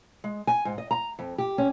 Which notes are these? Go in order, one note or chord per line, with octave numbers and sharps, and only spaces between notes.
G#3
G#5
G#2
D#5
A#5
F2
G4
C#4